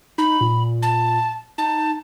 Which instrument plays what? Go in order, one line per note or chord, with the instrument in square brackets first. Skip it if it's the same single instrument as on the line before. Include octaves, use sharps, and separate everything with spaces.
[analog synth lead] D#4 [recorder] B5
[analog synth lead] A#2
[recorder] A5
[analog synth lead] D#4 [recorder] A5